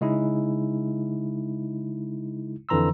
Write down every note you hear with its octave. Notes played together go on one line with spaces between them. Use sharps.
C#3 G#3 D#4 E4
F2 D3 E3 A#5 C6 E6